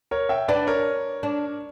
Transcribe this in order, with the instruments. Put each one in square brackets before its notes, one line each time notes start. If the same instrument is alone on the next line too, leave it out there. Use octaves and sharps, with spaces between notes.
[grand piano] A#4 C#5
E5 G5
[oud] D4 [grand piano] B4 D5
[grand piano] A#4 C#5
[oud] D4